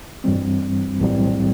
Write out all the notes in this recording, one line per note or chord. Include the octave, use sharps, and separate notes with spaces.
G2 E3 G3 C4
B1 A2 E3 G3 C4